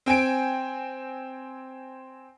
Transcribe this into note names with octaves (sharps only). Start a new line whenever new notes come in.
C4 G5 G#5 D7